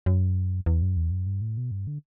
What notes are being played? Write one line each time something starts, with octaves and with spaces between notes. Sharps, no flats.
F#2
E2
F#2
E2
F#2
G2
A2
B2
G2
D3